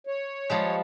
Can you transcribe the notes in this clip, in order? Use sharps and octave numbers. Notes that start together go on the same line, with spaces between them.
C#5
F3 G3 G#3